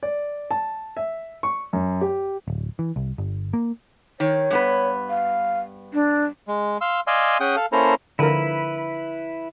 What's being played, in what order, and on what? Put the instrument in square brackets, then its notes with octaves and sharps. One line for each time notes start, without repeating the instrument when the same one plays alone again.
[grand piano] D5
A5
E5
C#6
F#2
G4
[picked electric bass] D1
E3
C2
G1
A#3
[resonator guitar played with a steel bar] D#3 [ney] C#5
[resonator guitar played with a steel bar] G2 B3 B4
[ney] F5
D4
[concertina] G#3
F5 C6 E6
D5 D#5 F5 G#5 C6 E6
C#4 G#4 F#5 G5 D#6
A4 F5
A#3 C#4 E4 A4 C5 A#5
[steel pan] D3 F3 A#4 [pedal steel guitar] E4 B4